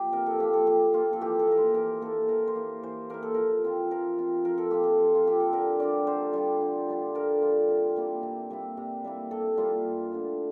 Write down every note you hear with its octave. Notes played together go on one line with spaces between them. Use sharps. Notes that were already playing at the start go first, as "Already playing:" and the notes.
Already playing: F3 A#3 G4
C3 A#4
A4
F3 A#3 G4
A4
C3 G4
F3 A#3 F4
A4
E3 G4
A4
A#3 E4 A#4
C5
E3 A#4
A#3 E4 A4
E3 A#4
C5
A#3 E4
E3 C5
A#3 E4 A#4
A4
F3 A#4
C4 F4
F3 A#4
C4 F4
F3 A#4
A4
C4 F4 G4
A4
F3
F4
C4 F4 G4
A4
D3 A#4
G3 D4 F4 D5
D3 C5
G3 D4 F4
D3
G3 D4 F4
D3 A#4
G3 D4 F4
C3
G3 A#3 E4
C3
G3 A#3 E4
C3
G3 A#3 E4
C3 A4
G3 A#3 E4 F4
G2
D3 A3 D4